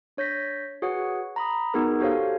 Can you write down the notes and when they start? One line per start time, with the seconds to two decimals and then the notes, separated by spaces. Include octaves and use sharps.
0.17 D4 C#5 G6 A#6 B6
0.82 F#4 G#4 B4 C#5 F#5
1.36 A#5 B5 D#6
1.74 B3 D#4 F#4 G#4 A#4
2.00 F#4 G4 A4 C5 C#5 F5